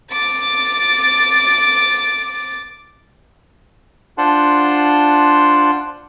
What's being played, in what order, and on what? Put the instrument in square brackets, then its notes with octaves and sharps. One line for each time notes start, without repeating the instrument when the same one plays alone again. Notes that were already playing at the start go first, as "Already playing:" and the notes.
[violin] D6 A6
[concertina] D4 F4 C5 F#5 A5 C6